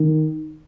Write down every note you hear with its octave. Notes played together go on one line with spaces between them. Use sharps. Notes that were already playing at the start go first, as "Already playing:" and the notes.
Already playing: D#3